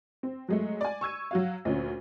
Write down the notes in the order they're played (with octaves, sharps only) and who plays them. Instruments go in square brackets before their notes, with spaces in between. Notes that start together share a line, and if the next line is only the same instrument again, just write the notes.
[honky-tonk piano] C4
F#3 G#3 A3
D5 G#5
C#6 E6 G#6 D#7
F#3 F#4 F5
D2 A#2 C#4